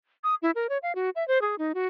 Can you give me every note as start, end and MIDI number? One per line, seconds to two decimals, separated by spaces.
0.24 0.35 87
0.42 0.51 64
0.55 0.67 70
0.69 0.78 73
0.83 0.95 77
0.95 1.10 66
1.16 1.26 76
1.28 1.41 72
1.42 1.58 68
1.58 1.73 63
1.75 1.88 66